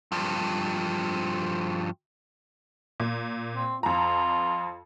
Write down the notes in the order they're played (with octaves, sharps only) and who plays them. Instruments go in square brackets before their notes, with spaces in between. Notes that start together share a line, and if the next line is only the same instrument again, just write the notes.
[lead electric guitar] G2 F3
[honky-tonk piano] A#2
[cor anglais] C4
[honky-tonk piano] F2 A#5 [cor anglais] F4